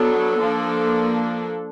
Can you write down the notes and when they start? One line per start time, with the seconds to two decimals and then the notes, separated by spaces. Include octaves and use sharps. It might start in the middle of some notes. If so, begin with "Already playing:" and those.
Already playing: F#3 B3 D4 A4
0.40 F3 A#3 D4